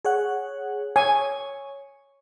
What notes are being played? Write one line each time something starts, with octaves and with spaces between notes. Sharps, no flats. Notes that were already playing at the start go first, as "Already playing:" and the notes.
G#4 C#5 F#5
C#5 G#5